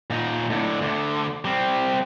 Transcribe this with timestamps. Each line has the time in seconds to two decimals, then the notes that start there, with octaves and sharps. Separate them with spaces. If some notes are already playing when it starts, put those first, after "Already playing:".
0.10 A#2 D#4
0.50 A2 D3
0.81 D2 D3
1.45 G3 C4